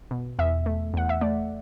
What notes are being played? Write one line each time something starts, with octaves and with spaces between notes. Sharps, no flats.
B2
E2 E5
A3
E2 F#5
E5
A3 D5